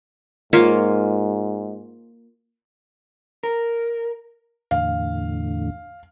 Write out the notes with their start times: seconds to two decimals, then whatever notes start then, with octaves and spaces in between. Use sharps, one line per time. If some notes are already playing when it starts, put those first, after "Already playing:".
0.53 G#2 A#3 F4 C#5
3.43 A#4
4.71 E2 A2 D3 F5